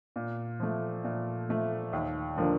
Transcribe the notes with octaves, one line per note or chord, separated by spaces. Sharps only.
A#2
F3 A3
A#2
F3 A3
D#2
D3 F3 A#3 D4